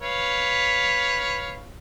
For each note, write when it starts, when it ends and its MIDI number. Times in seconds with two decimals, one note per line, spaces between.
0.01 1.66 71
0.01 1.66 73
0.01 1.66 77